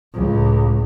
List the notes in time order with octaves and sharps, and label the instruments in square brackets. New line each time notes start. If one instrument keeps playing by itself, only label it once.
[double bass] C#2 A2